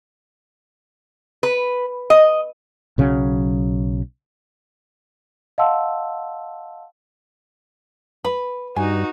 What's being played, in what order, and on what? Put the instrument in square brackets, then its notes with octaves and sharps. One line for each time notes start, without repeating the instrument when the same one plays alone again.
[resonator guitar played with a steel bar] B4
D#5
[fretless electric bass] B1 C#3 F#3 C#4
[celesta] D#5 F5 F#5 A5 C6 E6
[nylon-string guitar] B4 [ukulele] B5
[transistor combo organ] G2 [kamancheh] D#4 F#4 [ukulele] G#5